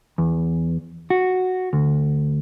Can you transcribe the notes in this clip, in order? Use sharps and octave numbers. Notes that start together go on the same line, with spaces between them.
E2
F#4
D2